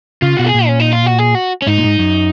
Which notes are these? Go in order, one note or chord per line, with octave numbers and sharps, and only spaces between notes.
C#3 F4
B2 F#4
G#4
A#2
C#4
D#4
F4
F#4
G#4
F#4
C#4
G#2 D#4
A#2
G#2
F#2